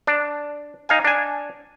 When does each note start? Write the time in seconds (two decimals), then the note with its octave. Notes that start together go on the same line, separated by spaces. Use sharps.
0.07 D4
0.89 D#4 F5 G#5
1.05 D4 G#5